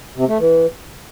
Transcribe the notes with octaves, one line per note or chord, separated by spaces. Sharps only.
C3
A3
E3